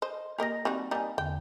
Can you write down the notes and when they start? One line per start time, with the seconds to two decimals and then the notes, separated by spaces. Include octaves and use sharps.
0.02 C5 D#5
0.38 A#3 G4 A#4 D#5 A#6
0.65 G3 C4 D#4 F#4
0.91 G3 A#3 D#4 F5 G#5
1.18 E2 D3 G5